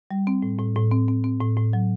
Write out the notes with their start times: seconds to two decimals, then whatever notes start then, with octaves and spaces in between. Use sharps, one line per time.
0.11 G3
0.27 C4
0.42 A2
0.59 A2
0.76 A2
0.92 C4
1.08 C4
1.24 C4
1.41 A2
1.57 A2
1.73 F#3